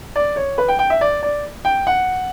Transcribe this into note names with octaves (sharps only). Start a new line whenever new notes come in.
D5
C#5
B4
G5
G5
E5
D5
D5
G5
F#5